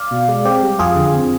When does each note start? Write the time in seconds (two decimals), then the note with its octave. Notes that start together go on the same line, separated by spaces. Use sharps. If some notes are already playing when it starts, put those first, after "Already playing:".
Already playing: D5 F5
0.11 B2
0.28 G#3
0.45 C4 G4
0.62 G3
0.79 F2 F4 G#4
0.96 D3
1.14 C4